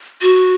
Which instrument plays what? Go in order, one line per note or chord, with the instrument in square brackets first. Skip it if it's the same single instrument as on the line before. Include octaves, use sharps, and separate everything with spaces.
[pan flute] F#4